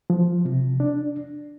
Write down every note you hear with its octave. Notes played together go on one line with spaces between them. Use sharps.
F3
C3
D4